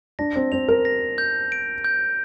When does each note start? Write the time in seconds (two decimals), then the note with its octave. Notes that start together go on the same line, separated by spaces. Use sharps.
0.19 D4 A#6
0.36 C4
0.52 C4 F7
0.68 A#4
0.85 A#6
1.18 G6
1.52 D7
1.84 G6